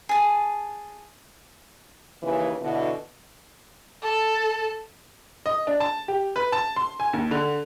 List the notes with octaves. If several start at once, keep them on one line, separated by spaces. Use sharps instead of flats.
G#4 A5
D#2 C#3 E3
B2 D3 E3
A4
D#5
D4
A5
G4
B4
A5
C6
G#5
D#2
D3